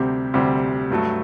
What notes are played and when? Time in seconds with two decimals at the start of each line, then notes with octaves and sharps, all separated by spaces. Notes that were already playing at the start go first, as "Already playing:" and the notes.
Already playing: D2 C3 G3 C4 G4
0.34 D2 C3 G3 C4 G4
0.90 G2 F#3 A3